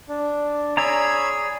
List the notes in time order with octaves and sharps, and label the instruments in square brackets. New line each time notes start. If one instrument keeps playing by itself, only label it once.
[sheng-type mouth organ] D4
[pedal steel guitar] G#4 D5 A#5 [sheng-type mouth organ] C#5 B5 E6